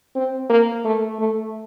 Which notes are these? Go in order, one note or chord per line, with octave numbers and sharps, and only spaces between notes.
C4
A#3
A3
A3